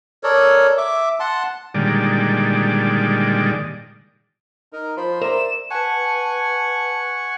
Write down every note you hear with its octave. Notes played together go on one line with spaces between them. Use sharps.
A4 A#4 C#5 D5
E5 D6
F#5 A5 C6
A#2 D3 D#3 G3 G#3 D5
D#4 A#4
F3 C5 B5 C6
A#4 C5 D5 E5 A#5 E7
B4 F#5 G#5 A5 C#6